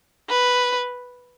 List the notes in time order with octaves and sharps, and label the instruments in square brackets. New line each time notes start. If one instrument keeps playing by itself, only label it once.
[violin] B4